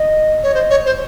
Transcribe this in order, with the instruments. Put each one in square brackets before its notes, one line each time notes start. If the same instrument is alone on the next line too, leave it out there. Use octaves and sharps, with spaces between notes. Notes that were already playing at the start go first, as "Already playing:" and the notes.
Already playing: [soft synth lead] D#5
[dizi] C#5
C5
C#5
C5